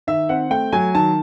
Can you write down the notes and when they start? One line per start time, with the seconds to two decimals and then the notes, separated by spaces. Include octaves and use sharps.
0.07 D#3 E5
0.29 C4 F#5
0.50 A3 G5
0.72 F#3 G#5
0.94 D#3 A5